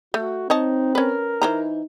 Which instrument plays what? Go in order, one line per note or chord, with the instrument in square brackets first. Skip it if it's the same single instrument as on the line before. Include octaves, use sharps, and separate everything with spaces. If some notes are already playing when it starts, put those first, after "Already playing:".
[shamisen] A3 [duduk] F#4
[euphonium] C4 [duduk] D#4 [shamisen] C#5 D#5 A5
[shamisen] C#4 B4 [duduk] A#4
[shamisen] E3 C5 A#5 [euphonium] D#4